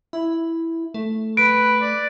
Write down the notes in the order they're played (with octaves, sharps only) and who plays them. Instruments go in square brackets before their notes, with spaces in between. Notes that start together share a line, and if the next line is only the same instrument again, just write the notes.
[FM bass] E4
A3
[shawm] B4 [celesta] D7
[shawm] D5